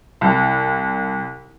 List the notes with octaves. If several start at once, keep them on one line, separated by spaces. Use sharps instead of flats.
C2